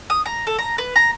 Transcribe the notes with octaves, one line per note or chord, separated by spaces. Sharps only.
D#6
A#5
A4
A#5
B4
A#5